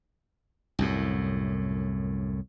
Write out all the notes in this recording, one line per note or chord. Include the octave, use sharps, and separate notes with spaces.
C2 F#2 A2